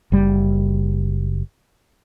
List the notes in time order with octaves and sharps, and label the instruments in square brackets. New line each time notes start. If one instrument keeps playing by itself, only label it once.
[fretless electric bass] F#1 G3